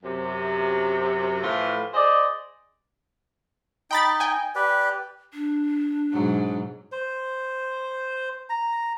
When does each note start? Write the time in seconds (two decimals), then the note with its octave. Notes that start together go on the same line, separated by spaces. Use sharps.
0.04 F#2 C3
1.43 A2 E3 F3 F4
1.94 G#4 C5 D5 D#5
3.91 D#4 D#5 G5 B5 A6
4.20 G5 G#5
4.55 G4 B4 D5
5.33 D4
6.13 G#2 B2 F#3
6.92 C5
8.49 A#5